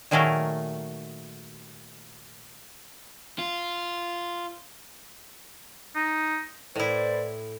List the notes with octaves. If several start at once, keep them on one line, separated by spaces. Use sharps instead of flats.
A#2 D#3 F#3 A3 G#4 A#4
F4
D#4
A2 E4 B4 C5 D5